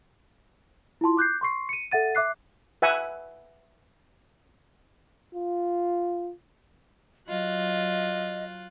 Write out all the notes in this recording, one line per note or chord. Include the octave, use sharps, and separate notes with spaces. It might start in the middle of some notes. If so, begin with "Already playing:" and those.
E4 F4 A5 C6
D6 F#6 G6 C7
C6 C#6 C7
C#7 D#7
A4 E5 F#5 A6 D#7
E5 D6 F#6 C7
B4 E5 F#5 G#5
F4
F#3 F4 D#5 F#6